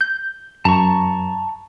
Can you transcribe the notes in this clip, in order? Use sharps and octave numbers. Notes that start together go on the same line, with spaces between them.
G6
F#2 A5 A#5 C#6